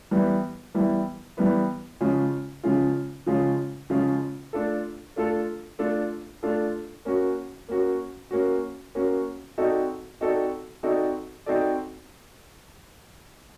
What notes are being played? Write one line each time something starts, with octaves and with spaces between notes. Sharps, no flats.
E3 G3 B3 E4
E3 G3 B3 E4
E3 G3 B3 E4
C#3 F3 G#3 C#4 F4
C#3 F3 G#3 C#4 F4
C#3 F3 G#3 C#4 F4
C#3 F3 G#3 C#4 F4
A3 D4 F4 A4
A3 D4 F4 A4
A3 D4 F4 A4
A3 D4 F4 A4
A#3 C#4 F#4
A#3 C#4 F#4
A#3 C#4 F#4
A#3 C#4 F#4
C4 D#4 F#4 A4 D5
C4 D#4 F#4 A4 D5
C4 D#4 F#4 A4 D5
C4 D#4 F#4 A4 D5